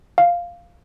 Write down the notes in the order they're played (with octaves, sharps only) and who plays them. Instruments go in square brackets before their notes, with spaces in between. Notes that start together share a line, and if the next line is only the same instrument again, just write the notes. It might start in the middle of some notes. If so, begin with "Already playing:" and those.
[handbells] F5